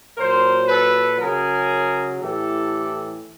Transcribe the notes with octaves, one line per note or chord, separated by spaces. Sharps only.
A#2 F#3 A#4 C5
A4 B4
C#3 F#3 G#4 A#4
A2 E3 G4 A4